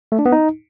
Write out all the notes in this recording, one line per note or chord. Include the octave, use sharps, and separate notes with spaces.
A3
D4
B3
D#4